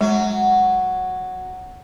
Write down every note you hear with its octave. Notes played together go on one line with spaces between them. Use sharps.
F#3 G#3